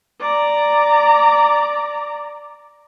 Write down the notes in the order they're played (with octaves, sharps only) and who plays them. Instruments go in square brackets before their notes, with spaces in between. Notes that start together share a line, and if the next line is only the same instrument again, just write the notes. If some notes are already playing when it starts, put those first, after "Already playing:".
[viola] D5 A#5